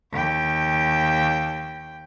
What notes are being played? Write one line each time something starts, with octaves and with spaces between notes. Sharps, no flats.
D#2 G5